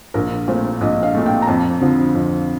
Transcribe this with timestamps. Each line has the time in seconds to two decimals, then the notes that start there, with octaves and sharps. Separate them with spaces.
0.14 A#1 A#4
0.48 A#2 A3 C5
0.81 A#1 D#5
1.03 F5
1.15 A#2 A3
1.26 G5
1.42 A#5
1.47 F2 A5
1.81 D3 F3 C4
2.14 F2